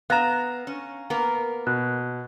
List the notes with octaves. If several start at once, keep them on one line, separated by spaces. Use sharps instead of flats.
B3 F5 A#5 F#6 A#6 E7
C#4
A#3 B3 A#4
B2 F#6